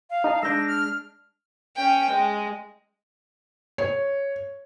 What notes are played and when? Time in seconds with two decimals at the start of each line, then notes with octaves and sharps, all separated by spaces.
0.10 F5
0.24 D#4 D#5 A5
0.43 G#3 D4 E6 G6 A#6
0.67 F6
1.76 C#4 G5
2.10 G#3
3.78 C#5